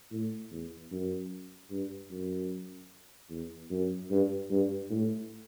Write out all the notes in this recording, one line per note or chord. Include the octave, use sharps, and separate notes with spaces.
A2
E2
F#2
G2
F#2
E2
F#2
G2
G2
A2